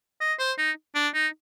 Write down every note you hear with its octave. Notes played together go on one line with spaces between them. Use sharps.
D#5
C5
D#4
D4
D#4